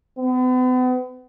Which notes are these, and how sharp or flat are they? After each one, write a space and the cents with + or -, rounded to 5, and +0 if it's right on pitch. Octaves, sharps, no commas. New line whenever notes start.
B3 +40